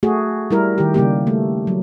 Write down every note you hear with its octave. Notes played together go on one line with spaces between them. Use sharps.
A3 F#4 G#4
G3 E4 A#4
D#3 G4
C#3 G3 A#3 G4
A3
F#3